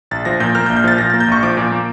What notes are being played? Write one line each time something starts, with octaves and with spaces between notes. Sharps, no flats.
A#1 A6
F3 A#6
A#2 G6
A#3 F6
G6
A#1
G6
F3 A6
A#2 A#6
A#3 A6
G6
A#1 C#6
F3 D6
A#2
A#3